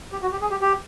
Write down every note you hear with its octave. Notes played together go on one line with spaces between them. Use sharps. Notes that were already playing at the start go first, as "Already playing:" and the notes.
G4
F#4
G4
G#4
G4
G4